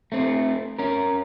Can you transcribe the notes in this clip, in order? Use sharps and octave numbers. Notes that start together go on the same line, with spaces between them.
A3 C4
C#4 A#4